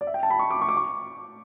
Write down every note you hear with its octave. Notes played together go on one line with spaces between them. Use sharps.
D5
E5
G5
A5
B5
C#6
D6
C#6
D6
C#6